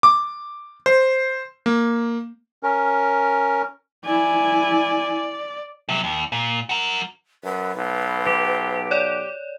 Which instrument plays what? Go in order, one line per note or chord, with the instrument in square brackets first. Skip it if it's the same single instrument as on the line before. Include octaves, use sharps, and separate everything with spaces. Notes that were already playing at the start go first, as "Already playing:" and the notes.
[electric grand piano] D6
C5
A#3
[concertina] C#4 A#4
[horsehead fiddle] E4 G#5 [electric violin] D5
[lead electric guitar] C3 F#3
D#2
A#2
F#4 A#4
[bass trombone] F#2 [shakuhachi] B4
[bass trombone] B1
[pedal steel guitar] G4
[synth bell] C#5 D5